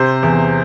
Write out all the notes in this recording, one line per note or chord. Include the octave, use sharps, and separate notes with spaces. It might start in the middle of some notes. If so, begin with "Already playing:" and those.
Already playing: C3 C5
E2